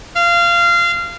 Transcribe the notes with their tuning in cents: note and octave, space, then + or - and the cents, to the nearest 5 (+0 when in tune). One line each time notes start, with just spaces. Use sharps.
F5 -20